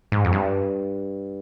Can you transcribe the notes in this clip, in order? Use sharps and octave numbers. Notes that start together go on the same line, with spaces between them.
G#2
F2
G2